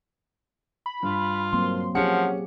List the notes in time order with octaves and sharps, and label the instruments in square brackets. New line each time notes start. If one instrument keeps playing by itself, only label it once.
[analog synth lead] B5
[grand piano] G2 [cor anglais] F4
[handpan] F#3 A#3 C4 [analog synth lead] C6
[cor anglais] F3 [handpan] F#3 G4 G#4 [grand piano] C#4 C#7 [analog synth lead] F#5